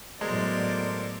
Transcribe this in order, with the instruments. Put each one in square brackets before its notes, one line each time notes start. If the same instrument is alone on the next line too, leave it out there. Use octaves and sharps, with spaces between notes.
[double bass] A2 F#3 [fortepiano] G#3 [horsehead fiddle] B3 D5 [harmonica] A4 A#4 C5